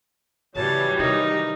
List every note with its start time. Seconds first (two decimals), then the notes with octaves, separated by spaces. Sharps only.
0.55 A2 C#3 E3 F#3 G3 C#5 A5
0.99 C3 D#3 D#4 A#4